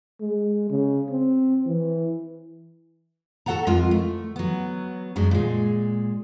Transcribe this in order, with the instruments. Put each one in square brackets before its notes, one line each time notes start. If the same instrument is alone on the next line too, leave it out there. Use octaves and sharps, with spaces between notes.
[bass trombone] G#3
C#3
C4
E3
[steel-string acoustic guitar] F#4 A4 F#5 A5 A#5
F2 G#3 F4 A#4
A3
F#3 B3
F#2 F#3 G#3 D4
A#2 G#3